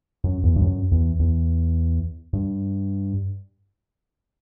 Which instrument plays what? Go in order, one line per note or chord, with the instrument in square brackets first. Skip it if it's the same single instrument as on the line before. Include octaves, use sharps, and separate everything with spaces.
[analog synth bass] F#2
E2
G2
F#2
E2
E2
G2